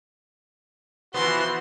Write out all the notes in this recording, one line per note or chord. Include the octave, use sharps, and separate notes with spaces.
E3 F3 B3 F#4 C6